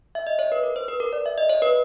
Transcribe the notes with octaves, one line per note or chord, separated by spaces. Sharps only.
E5
D#5
C#5
B4
A#4
C5
B4
A#4
D5
E5
D#5
C#5
B4